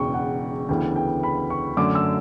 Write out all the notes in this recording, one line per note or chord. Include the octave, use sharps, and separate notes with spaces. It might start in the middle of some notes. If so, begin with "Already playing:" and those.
Already playing: E1 E2 C#3 G5 C#6
F#5
D2 C#3 E3 B3 G5
G5
B5
C#6
F#2 D3 A3 D6
E6